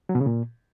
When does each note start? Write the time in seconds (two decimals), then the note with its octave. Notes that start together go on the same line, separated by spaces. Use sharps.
0.09 F#3
0.15 B2
0.21 C#3
0.26 A#2